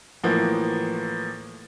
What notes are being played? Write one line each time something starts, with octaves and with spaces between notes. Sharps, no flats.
A2 E3 F3 A#3 B3